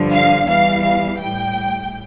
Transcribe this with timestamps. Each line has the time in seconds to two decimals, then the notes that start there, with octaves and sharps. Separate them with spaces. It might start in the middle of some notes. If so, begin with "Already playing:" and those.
Already playing: G2 D3 F3
0.12 F5
0.48 E2 E3 G3 F5
0.84 F5
1.20 A2 G3 G5